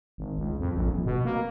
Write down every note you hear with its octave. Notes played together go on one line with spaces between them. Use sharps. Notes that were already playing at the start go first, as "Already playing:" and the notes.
G#1
C#2
F2
A#1
D#1
B2
A#3